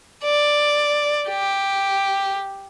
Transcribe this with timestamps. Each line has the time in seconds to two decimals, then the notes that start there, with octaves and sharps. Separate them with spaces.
0.24 D5
1.29 G4